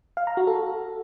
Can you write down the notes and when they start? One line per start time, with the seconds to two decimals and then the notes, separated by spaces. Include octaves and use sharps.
0.17 F5
0.27 A#5
0.37 F#4
0.47 A4